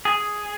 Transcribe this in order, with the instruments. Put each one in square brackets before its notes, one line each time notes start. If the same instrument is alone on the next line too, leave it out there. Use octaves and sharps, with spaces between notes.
[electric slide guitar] G#4